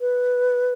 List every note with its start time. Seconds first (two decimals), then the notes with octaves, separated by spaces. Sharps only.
0.01 B4